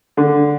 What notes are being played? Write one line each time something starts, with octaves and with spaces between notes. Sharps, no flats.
D3